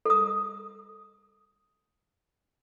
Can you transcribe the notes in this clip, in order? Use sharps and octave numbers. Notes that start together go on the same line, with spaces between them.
A4 D#6